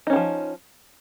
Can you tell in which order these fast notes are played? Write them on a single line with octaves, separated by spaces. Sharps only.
D#4 C#4 D#3 F3